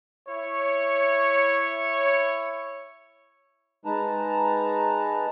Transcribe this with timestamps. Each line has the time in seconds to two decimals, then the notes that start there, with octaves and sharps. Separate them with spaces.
0.28 E4 C#5
3.85 G#3 D#4 B4 A5 A#5